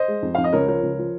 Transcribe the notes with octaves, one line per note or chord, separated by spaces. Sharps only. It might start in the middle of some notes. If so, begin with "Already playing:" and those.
Already playing: C5 D#5
G#3
F2
F2 F5
D#5
C#2 A#4 C#5
F3 A#4 C#5
C#2
F3